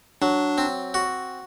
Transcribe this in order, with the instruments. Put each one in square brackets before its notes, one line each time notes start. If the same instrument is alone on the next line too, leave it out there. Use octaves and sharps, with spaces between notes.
[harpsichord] F#3 [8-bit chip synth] D4
[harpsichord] C4
F#4